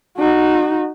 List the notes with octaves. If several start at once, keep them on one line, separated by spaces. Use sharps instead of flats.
D#4 F#4